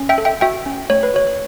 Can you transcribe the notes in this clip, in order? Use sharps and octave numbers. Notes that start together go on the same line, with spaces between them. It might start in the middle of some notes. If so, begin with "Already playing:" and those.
Already playing: C#4
E5 G5
A4
E5 G5
F#4 E5 G5
C#4
A3 C#5
B4
F#4 C#5